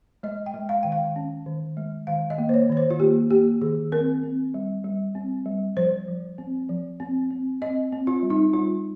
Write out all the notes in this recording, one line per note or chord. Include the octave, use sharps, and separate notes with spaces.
G#3 D#5
G5
G#3
F5
D#3 G5
F5
C#4
D#3
G#3
D#3 F5
D#5
A#3
C5
C#5
D#3 C#5
C5
F4
A#3 G4
A#3 G4
D#3 G#4
C4 A#4
C4
G3
G3
C4
G3
F3 C5
F3
C4
F3
C4
C4
C4 D#5
C4
F4
G3
D#4
G3 F4